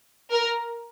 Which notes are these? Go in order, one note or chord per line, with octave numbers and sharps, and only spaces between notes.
A#4